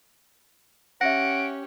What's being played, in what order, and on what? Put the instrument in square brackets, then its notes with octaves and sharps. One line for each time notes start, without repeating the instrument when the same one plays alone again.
[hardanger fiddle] C#4 G4 [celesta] E5 A#6 [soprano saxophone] F#5 [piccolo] D7